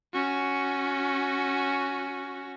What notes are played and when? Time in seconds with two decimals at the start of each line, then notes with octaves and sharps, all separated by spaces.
0.13 C#4 F#4